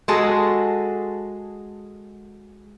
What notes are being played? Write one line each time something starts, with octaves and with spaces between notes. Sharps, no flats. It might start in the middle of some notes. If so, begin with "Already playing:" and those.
G#3 F#4 G#4 A4